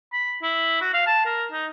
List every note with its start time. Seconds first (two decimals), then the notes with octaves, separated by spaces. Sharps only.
0.13 B5
0.43 E4
0.81 F#4
0.93 F5
1.07 A5
1.25 A#4
1.52 D#4